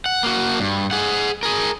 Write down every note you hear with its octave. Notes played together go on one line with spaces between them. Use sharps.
F#5
A#3 F#4
G2
G#4 F#5
G#4 A#4